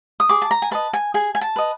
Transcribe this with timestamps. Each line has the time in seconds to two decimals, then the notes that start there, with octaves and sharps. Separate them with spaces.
0.20 D#6
0.29 G#4 D6
0.42 A5
0.51 A#5
0.62 G#5
0.71 B4 D#5 A5
0.93 G#5
1.14 G#4 G#5
1.35 G#5
1.41 A5
1.56 B4 D#5